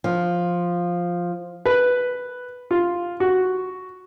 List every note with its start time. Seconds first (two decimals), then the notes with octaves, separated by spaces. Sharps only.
0.04 F3
1.65 B4
2.71 F4
3.20 F#4